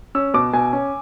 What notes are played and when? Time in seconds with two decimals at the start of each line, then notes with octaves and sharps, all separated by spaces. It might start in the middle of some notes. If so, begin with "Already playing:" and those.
0.15 C#4 E6
0.34 B2 D6
0.53 B2 G#5
0.73 C#4